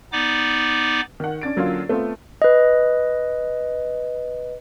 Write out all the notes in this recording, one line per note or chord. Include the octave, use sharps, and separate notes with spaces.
B3 D#4 D5 D6
D#3 F#5
C#4 D4 A6 D7
D3 F#3 A#3 C#4 F4
A3 B3 C4 F4
B4 D#5